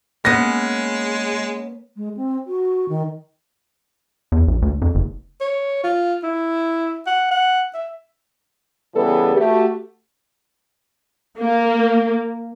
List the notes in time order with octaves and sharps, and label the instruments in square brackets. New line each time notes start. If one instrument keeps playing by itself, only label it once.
[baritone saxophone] G#3 [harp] A#3 [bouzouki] B3 C#4 [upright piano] A#6
[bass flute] G#3
C4
F#4
D#3
[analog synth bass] E2
A#1
D2
F2
F#1
[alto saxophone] C#5
F4
E4
F#5
F#5
E5
[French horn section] C#3 E3 G3 B3 G#4 A4
A3 F#4 G4
[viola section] A#3